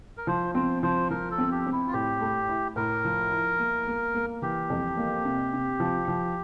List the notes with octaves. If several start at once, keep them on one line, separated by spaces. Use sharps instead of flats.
A#4
F3 C5
C4 C5
F3 C5
F3 A#4
A4
C4
G4
C4
E4
F4
A2 G4
A3
E4
A2 A#4
F3
E4
A#3
A#3
A#3
E3 G4
F2
A#3
C3
C3
F3
F3